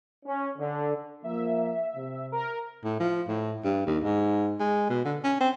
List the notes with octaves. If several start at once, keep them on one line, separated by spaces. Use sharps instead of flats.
C#4
D3
F3 A#3 E5
C3
A#4
A2
F3
A2
G2
D#2
G#2
G#3
B2
D3
C#4
C4